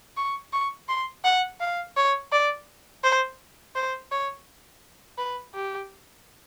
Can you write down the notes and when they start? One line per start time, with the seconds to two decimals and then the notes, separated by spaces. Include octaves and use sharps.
0.17 C#6
0.53 C#6
0.89 C6
1.24 F#5
1.60 F5
1.97 C#5
2.32 D5
3.04 C5
3.76 C5
4.12 C#5
5.18 B4
5.55 G4